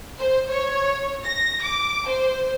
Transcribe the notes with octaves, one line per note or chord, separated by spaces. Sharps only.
C5
C#5
A#6
D6
C5